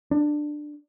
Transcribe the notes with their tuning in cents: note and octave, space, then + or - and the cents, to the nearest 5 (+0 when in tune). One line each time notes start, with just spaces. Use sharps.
D4 +15